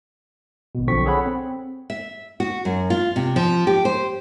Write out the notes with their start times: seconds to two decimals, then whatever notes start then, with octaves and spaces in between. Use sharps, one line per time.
0.75 G#1 B2
0.88 B1 D3 F3 C4 C#6 B6
1.06 G#4 A4 C#5 F#5 B5
1.26 C4
1.90 E5
2.40 F#4
2.65 F#2
2.90 F4
3.16 C3
3.36 F3
3.67 G4
3.85 C5